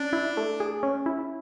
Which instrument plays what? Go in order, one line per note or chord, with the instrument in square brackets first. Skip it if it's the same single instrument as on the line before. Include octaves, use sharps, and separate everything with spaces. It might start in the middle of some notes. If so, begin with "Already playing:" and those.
Already playing: [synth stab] C#4 [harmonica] D4
[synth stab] E4
A3
G#4
C#4
E4